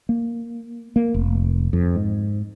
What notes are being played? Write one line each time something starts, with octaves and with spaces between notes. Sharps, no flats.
A#3
A#3
F1
F2
G#2